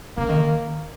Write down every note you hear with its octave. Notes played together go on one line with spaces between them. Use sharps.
C#3 A#3
D#3